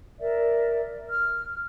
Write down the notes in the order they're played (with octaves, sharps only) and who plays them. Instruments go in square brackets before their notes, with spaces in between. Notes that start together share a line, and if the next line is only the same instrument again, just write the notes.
[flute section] A#4 D5 E5
F6